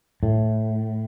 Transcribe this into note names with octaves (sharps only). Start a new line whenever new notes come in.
A2